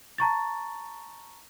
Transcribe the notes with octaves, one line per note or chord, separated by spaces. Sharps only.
A5 A#5 C#6 A6